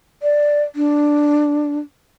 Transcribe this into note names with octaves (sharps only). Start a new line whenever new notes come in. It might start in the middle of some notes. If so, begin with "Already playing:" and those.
D5
D4